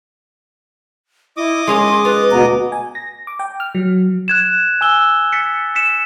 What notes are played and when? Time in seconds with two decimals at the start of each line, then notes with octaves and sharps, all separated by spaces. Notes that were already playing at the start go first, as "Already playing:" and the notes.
1.37 E4 D#5 D6 D#6
1.67 G#3 C#4 G#4 C6
2.05 F4 B4
2.31 D2 B2 B3 A#5
2.72 G#5
2.95 A#6
3.27 D6
3.39 G5
3.60 F6
3.75 F#3
4.28 F#6 G#6 E7
4.81 G#5 E6 G7
5.33 A6 B6 C#7
5.75 B6 C#7 E7